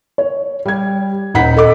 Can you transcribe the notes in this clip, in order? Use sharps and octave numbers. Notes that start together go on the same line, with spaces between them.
C#5
G3 G#6
D#1 D#4 F#5 B5 B6
A4 D#5 D6